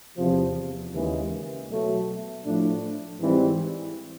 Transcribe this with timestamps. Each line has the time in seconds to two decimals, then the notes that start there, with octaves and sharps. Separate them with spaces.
0.17 E2 C3 F3
0.93 D#2 C#3 E3 G#3
1.68 B2 F#3 A3
2.44 A2 F3 A3 D4
3.19 G#2 E3 G3 C4